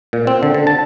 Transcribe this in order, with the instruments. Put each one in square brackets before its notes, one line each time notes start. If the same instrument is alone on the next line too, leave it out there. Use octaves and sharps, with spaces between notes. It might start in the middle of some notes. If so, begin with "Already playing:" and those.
[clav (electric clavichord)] A#2
C4
D3
D3
A5